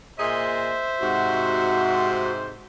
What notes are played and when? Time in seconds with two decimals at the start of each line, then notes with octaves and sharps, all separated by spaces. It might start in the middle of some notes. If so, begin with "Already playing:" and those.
0.19 A#2 G#4 C5 D#5 E5
1.01 G#2 C3 F#4